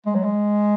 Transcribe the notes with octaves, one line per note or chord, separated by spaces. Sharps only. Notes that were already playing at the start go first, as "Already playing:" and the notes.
G#3
F#3
G#3